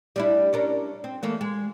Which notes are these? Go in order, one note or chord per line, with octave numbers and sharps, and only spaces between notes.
G3 D4 E4
C#4 D4 A#4
C4
E3 A3 A#3
G#3